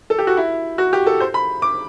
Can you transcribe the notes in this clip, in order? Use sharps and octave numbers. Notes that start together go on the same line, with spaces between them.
A4
G4
F#4
E4
F#4
G4
A4
C5
B5
D6